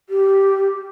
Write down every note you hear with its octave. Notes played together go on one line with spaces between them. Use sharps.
G4